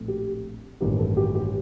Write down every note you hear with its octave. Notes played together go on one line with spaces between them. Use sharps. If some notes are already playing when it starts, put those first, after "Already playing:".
Already playing: A#1 A2 A3 C4
G4
A1 G2 D#3 A#3 G4
A4
G4
G4